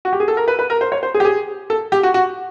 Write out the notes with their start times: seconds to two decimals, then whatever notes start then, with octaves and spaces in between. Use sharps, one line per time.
0.05 F#4
0.13 G4
0.20 G#4
0.28 A4
0.37 A#4
0.48 B4
0.59 B4
0.70 A#4
0.81 C5
0.92 C#5
1.03 C5
1.14 G#4
1.20 G4
1.25 G#4
1.70 A4
1.92 G4
2.03 F#4
2.14 F#4